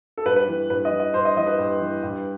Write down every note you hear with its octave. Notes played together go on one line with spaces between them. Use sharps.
A4
G2 B4
B4
E3
G2 B4
D#5
E3
D#5
G2 C5
D#5
E3 D#5
B4
G2
E3
G2